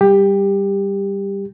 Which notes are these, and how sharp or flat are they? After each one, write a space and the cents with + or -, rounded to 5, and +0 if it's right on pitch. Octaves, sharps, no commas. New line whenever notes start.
G3 +0 G4 +15